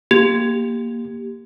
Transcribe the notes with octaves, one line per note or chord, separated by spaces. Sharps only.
A#3 G4